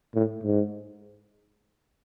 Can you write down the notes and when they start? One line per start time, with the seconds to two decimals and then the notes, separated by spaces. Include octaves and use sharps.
0.15 A2
0.44 G#2